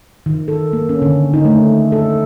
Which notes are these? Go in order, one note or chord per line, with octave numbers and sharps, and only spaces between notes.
D#3
A4
A#3
C#4
D3
D#4
A3
A4